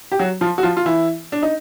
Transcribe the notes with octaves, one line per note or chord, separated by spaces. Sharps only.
G4
F#3 F#4
F3 F4
F#4
F3 F4
F4
E3 E4
D4
D#4